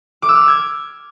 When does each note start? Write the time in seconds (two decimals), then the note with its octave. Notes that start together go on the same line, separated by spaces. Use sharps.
0.22 D6
0.29 E6
0.35 F6
0.41 D7
0.48 G#6